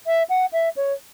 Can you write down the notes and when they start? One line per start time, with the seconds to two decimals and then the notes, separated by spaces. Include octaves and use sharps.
0.07 E5
0.29 F#5
0.53 E5
0.76 C#5